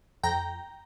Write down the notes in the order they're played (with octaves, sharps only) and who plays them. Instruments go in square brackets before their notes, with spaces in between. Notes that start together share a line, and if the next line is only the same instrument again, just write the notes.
[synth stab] F2 G5 A#5